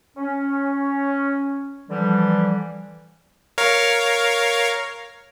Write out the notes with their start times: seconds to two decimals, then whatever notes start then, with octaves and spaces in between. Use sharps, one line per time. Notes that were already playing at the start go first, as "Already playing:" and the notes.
0.17 C#4
1.90 D3 E3 F3 G3
3.58 A#4 C#5 F5